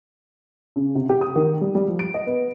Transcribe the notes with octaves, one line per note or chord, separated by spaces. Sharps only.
C#3
C3
G4
D#6
D#3
G3
G3
F3
D7
D#5
B3